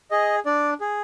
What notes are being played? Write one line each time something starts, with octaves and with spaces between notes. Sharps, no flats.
G#4 D#5
D4 D5
G#4